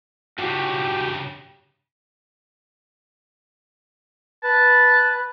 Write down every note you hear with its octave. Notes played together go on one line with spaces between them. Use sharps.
G2 C#3 F#4 G4
B4 A5